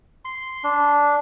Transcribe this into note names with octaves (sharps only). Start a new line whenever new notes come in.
C6
D4